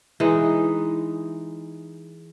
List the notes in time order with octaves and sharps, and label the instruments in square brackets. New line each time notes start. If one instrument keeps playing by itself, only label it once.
[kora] E3 G#3 D#4